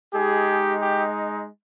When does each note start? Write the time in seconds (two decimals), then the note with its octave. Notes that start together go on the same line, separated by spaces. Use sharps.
0.13 G#3 D#4 G4 G#4
0.80 G4